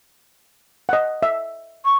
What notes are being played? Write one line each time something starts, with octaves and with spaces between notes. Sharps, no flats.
D#5 F#5
E5
C#6